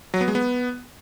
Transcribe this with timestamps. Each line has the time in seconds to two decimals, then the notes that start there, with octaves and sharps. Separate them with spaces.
0.14 F#3
0.21 B3
0.28 G#3
0.35 B3